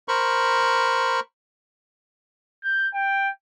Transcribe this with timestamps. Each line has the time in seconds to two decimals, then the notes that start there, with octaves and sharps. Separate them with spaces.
0.08 A#4 C5 B5 C#6
2.63 G6
2.94 G5